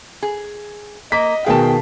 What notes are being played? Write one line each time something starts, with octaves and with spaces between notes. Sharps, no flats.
G#4
A#3 D#5 B6
B2 D#3 G#4 F5 G5 A5